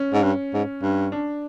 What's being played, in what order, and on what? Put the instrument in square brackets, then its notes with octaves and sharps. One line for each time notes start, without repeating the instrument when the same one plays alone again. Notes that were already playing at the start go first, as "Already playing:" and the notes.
Already playing: [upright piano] C#4
[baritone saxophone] G#2
G2
G#2
G2
[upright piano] D4